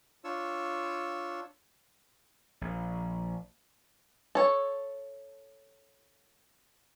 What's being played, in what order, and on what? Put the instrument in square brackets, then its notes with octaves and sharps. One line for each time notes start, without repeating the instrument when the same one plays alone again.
[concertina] D4 F4 C#5 E6
[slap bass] A#1
[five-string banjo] A4 C#5